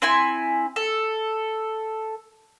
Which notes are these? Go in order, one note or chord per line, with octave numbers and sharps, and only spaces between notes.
C4 E4 G#5
A4